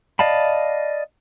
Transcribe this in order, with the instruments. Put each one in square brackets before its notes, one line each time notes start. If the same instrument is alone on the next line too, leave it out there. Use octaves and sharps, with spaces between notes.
[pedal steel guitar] D5 D#5 F5 A5 B5